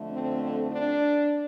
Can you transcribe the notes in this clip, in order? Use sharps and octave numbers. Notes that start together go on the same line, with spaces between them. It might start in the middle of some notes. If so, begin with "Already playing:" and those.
Already playing: F2 D3 A3
C4
C4
D4